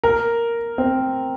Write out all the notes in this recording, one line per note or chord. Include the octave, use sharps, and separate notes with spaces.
A#4
C4